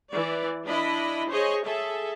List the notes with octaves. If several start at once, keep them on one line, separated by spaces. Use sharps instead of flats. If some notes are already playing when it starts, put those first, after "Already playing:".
E3 D5
D4 E4 D#5 B5
G#4 C5 C#5 D#5
G#4 A4 E5